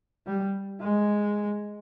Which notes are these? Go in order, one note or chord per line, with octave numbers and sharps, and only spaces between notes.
G3
G#3